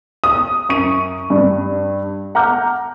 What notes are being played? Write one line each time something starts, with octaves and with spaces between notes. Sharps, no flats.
D#6
F#2 C#6 D#7
G2
F#5 A#5 D6 F6 G6